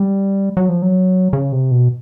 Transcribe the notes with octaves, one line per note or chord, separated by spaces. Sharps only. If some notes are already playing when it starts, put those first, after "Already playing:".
Already playing: G3
F#3
F3
F#3
C#3
C3
B2